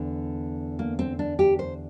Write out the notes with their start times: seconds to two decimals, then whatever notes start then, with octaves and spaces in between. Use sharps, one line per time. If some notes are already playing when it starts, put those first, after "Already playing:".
Already playing: E2 D3
0.79 A#3
0.99 C4
1.19 D4
1.39 G4
1.59 C5